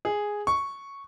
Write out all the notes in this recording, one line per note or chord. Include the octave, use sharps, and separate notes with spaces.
G#4
C#6